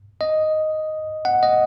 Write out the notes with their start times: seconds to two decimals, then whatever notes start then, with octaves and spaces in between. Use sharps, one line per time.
0.21 D#5
1.25 F#5
1.43 D#5